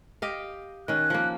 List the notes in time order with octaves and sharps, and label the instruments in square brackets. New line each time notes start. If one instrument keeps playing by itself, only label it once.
[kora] G4 D#5 F5
[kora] D#3 C#4 [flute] F#6
[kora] F3 A#3